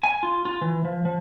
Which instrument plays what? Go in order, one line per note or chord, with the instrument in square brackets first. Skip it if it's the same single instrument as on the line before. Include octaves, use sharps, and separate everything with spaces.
[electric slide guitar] G#5
F4
F4
E3
F3
F3